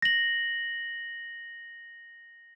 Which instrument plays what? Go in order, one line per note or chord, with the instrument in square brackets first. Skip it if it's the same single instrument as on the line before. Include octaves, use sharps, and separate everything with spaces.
[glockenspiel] A#6 F#7